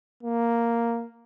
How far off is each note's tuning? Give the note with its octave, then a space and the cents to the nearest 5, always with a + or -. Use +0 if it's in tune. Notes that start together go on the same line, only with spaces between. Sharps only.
A#3 +0